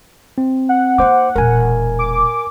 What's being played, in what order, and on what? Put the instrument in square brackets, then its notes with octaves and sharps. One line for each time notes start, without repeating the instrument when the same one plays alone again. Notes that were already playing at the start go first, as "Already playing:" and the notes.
[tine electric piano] C4
[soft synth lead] F#5
[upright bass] A#3 D#4 [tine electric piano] C5 D6
[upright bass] E1 A#2 [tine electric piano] A#4 G#5
[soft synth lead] D6